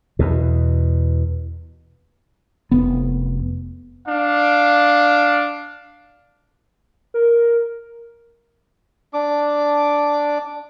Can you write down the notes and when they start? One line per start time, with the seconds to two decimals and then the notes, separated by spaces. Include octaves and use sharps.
0.19 E2 B2
2.71 F1 B3
4.08 D4 F5
7.14 A#4
9.14 D4 D6